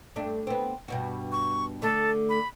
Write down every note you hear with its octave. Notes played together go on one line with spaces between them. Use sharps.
G2 A3 D4
B3 C4
G2 B2 F#4
C#6
D3 A3 A4
B5